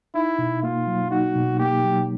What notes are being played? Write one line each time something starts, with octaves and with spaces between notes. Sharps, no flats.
D#4 E4
B2
A#3 F4
F#3
D#4 F#4
B2
A#3 G4
F#3